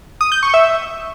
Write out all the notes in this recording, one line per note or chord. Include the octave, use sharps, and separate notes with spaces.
D#6
G6
C#6
E5